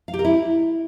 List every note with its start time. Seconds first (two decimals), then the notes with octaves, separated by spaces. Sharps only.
0.08 F5
0.14 G4
0.19 A#4
0.25 E4